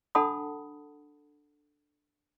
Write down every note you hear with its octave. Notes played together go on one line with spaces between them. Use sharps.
D4 A4 F#5 A5 B5 D#6